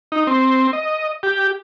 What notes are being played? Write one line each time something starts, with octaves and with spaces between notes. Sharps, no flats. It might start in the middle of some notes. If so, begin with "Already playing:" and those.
D#4
C4
D#5
G4